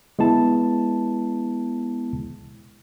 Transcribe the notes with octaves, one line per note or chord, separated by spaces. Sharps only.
G#3 B3 E4 A5